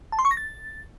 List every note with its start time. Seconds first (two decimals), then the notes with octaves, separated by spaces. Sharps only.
0.12 A5
0.19 C6
0.25 C#6
0.31 A#6
0.37 A6